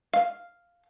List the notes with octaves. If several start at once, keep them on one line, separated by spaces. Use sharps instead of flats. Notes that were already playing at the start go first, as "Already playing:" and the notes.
F5